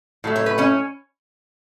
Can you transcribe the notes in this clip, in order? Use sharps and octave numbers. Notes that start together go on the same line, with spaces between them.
A2 F#3 A3
C#5
B4
C#4 C#5